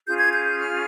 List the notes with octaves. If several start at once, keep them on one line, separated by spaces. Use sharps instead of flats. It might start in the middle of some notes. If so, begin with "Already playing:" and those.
C#4 F4 G#4 G6
G#6
G6
G6
F6